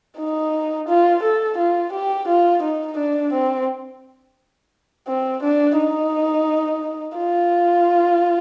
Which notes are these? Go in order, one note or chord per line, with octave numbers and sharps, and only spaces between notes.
D#4
F4
A4
F4
G4
F4
D#4
D4
C4
C4
D4
D#4
F4